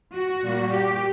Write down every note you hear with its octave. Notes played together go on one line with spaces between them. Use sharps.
F#4
A#2 G3 A#3
G4